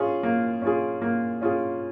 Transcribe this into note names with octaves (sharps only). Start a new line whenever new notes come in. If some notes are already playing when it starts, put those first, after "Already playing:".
Already playing: C#4 F4 G#4
A#3
C#4 F4 G#4
A#3
C#4 F4 G#4